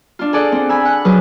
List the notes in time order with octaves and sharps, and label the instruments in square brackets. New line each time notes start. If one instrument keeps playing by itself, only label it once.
[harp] D4 F4
G#4 A4 D5 F#5
C4
G#5 B5 E6
F#5 F#6
F3 F#3 F4 G#4 B4